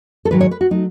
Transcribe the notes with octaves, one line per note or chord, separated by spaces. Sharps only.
A4
G#2 D#3 F#3 B4
C#5
B4
F#4
F#3 A3 D#4